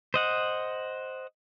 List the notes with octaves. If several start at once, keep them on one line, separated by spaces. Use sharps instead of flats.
C5 D#5 F#5